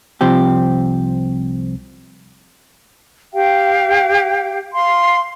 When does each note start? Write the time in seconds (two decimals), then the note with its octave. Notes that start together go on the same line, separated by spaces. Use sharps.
0.21 C2 F3 C4 G4
3.33 G4 F5 G5
4.72 F5 C6